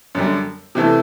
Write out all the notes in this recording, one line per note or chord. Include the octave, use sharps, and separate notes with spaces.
F#2 D3 G3 D4
C3 E3 A3 E4 A4